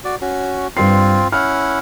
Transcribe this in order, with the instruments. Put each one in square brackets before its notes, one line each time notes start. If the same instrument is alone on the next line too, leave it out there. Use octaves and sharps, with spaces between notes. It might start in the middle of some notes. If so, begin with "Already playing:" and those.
[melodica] F#4 D5
C#4 F#4
[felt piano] G2 B4 C7 [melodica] C4 F4
[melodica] C#4 E4 F#5 [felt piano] F6